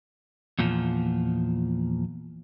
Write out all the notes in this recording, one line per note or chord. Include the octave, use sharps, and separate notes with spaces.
E2 A#2 F3